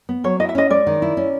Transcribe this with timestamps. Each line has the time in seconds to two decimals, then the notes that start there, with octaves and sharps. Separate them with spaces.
0.09 B3
0.24 F#3 C#5
0.40 E4 D#5
0.49 E5
0.55 C#4 D#5
0.71 G#3 D5
0.87 D#3
1.02 E4
1.17 C#4